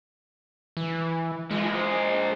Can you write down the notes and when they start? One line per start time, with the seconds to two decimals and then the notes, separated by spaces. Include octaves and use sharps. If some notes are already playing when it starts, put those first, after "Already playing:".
0.77 E3
1.51 E3 F3 G#3
1.71 A#2 C5